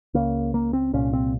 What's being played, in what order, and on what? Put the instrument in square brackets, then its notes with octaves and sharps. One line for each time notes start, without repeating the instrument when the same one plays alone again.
[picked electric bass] C#2 C#3 A#3
A#3
C4
C2 A#2 C#4
C4